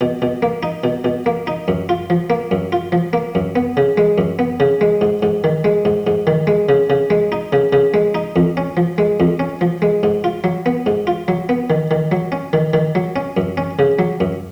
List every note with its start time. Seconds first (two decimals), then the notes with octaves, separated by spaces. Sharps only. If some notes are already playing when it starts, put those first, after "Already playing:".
0.01 B2
0.22 B2
0.43 A#3
0.63 D#4
0.84 B2
1.04 B2
1.26 A#3
1.47 D#4
1.68 F#2
1.89 F4
2.10 F3
2.30 A#3
2.51 F#2
2.72 F4
2.92 F3
3.13 A#3
3.35 F#2
3.56 B3
3.77 C#3
3.97 G#3
4.18 F#2
4.39 B3
4.60 C#3
4.81 G#3
5.01 G#2
5.23 G#2
5.44 D#3
5.64 G#3
5.85 G#2
6.07 G#2
6.27 D#3
6.47 G#3
6.69 C#3
6.90 C#3
7.10 G#3
7.32 D#4
7.53 C#3
7.73 C#3
7.94 G#3
8.15 D#4
8.36 F2
8.57 C#4
8.77 F3
8.98 G#3
9.20 F2
9.39 C#4
9.61 F3
9.82 G#3
10.03 G#2
10.24 F4
10.44 F#3
10.66 B3
10.86 G#2
11.07 F4
11.28 F#3
11.49 B3
11.70 D#3
11.91 D#3
12.12 F#3
12.32 C#4
12.53 D#3
12.73 D#3
12.95 F#3
13.16 C#4
13.37 F#2
13.57 C#4
13.79 C#3
13.99 F#3
14.20 F#2